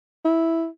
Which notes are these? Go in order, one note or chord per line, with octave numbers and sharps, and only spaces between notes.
E4